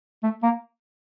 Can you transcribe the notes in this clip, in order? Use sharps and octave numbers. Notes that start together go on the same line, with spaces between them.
A3
A#3